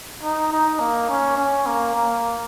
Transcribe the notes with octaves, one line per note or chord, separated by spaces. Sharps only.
D#4
D#4
A#3
C#4
C#4
A#3
A#3